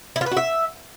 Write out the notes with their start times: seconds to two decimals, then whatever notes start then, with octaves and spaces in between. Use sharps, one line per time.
0.16 E4
0.21 F4
0.26 B4
0.31 F#4
0.37 E5